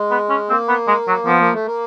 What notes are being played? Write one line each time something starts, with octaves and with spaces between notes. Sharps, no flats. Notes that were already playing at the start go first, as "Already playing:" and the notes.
Already playing: G#3
B3
C#4
A#3 C4
B3
G#3
F#3
F3 B3
A#3
A3
A#3